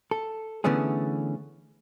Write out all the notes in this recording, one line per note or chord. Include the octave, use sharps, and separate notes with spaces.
A4
D3 E3 A3 B3 C#4 G#4